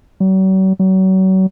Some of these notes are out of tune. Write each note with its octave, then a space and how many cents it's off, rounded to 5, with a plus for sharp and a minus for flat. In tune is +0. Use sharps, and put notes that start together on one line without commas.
F#3 +45
F#3 +35